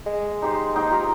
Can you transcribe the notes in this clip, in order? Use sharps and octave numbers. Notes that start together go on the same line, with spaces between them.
G#3
D#4 G4 C5
A#3 D#4 G5
F4 G4 A#5